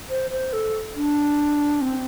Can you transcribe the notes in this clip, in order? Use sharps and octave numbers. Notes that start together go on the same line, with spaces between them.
C5
C5
A4
D4
C4